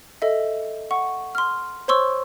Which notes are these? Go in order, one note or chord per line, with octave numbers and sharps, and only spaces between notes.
A4 D#5 E5
F#5 C#6
C6 F6
C5 C#5 C6 C#6 E6